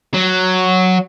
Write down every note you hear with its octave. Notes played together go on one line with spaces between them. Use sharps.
F#3